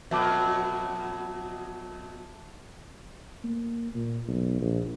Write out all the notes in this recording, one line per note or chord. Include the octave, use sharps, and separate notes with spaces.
F2 B2 F#3 E5 A5 D6
A#3
A#2
B1
A#1